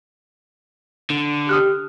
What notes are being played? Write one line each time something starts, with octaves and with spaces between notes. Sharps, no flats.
D3
G4 D#6 F6 F#6